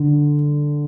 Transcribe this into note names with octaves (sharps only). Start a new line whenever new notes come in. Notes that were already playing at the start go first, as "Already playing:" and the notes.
Already playing: D3